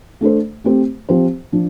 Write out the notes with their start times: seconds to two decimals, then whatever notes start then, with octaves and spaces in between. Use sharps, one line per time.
0.21 A3 D4 A4 C5
0.64 A3 C4 G4 C5
1.09 F3 C4 G4 C5
1.52 F3 D4